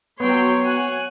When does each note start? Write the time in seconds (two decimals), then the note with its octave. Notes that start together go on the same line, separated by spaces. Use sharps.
0.20 F#3 B3 C#5 G5 C6
0.64 F#5 G#5